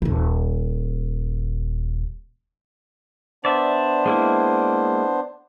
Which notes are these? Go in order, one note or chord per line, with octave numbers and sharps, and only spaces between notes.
D#1 G#1
B3 D4 C5 D5 E5
G#3 A#3 E4